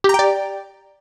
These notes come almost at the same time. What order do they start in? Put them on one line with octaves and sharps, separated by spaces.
G4 A#5 G5 D5